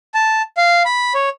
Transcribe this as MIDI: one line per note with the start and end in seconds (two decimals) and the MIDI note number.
0.14 0.42 81
0.57 0.83 77
0.85 1.13 83
1.15 1.29 73